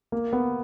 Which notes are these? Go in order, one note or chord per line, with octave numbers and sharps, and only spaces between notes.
A#3
B3